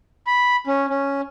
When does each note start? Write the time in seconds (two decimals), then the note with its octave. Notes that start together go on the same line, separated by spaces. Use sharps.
0.27 B5
0.67 C#4
0.90 C#4